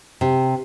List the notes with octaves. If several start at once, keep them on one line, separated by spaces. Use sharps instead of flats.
C3